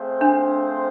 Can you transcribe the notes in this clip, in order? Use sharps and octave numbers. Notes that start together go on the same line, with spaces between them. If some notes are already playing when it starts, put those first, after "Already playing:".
Already playing: A3 C4 G#4 C5 F5
D4